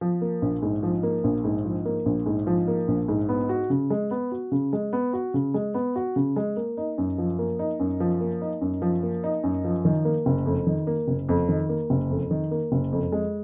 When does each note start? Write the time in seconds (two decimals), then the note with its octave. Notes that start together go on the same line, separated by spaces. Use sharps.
0.01 F3
0.21 A#3
0.42 A#1
0.62 G#2
0.83 F3
1.03 A#3
1.24 A#1
1.44 G#2
1.65 F3
1.85 A#3
2.06 A#1
2.26 G#2
2.47 F3
2.68 A#3
2.88 A#1
3.08 G#2
3.29 B3
3.49 F#4
3.70 C#3
3.90 G#3
4.11 B3
4.32 F#4
4.52 C#3
4.73 G#3
4.93 B3
5.13 F#4
5.34 C#3
5.54 G#3
5.74 B3
5.96 F#4
6.16 C#3
6.36 G#3
6.57 A#3
6.77 D#4
6.98 F#2
7.18 F3
7.39 A#3
7.59 D#4
7.80 F#2
8.00 F3
8.21 A#3
8.41 D#4
8.61 F#2
8.82 F3
9.03 A#3
9.24 D#4
9.44 F#2
9.64 F3
9.85 D#3
10.05 A#3
10.26 F#1
10.46 F2
10.67 D#3
10.87 A#3
11.08 F#1
11.29 F2
11.49 D#3
11.69 A#3
11.90 F#1
12.10 F2
12.31 D#3
12.51 A#3
12.72 F#1
12.92 F2
13.12 G#3